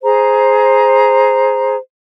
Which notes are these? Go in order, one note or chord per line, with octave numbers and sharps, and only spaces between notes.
G#4 C5 A#5